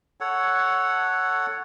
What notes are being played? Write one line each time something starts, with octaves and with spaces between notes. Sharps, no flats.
A4 C#5 F#5